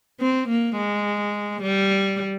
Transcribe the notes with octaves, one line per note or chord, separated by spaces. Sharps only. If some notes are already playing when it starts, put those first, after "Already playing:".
C4
A#3
G#3
G3